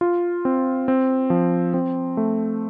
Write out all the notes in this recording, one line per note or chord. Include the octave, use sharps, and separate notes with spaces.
F4
C4
C4
F3
C4
A3